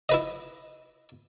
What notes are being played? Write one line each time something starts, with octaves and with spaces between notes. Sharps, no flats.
E4 B4 D#5